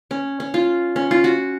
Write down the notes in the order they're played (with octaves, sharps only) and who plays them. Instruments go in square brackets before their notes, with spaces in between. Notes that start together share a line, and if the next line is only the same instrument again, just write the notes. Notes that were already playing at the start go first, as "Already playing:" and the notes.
[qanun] C#4
C#4
F4
C#4
F4
F#4